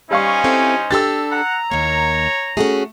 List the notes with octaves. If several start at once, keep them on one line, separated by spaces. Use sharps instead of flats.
G3 C#4 D#4 C5 F5 G#5 C#6
C4 E4 A4
D4 G4 A4 E6 A6
F#5 A#5
D#2 A#3 C#5
A3 C#4 F#4 G#4